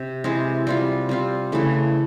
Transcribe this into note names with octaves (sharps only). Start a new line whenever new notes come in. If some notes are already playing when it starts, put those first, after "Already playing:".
Already playing: C3
C3 E3 G#3 C4
G3 C4 F4
G3 C4 F4
C#3 E3 A3